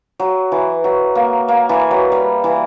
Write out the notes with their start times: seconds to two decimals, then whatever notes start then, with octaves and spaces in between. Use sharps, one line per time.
0.20 F#3
0.52 E3
0.84 F#3
1.15 A#3
1.48 A#3
1.69 E3
1.91 F#3
2.12 G3
2.44 E3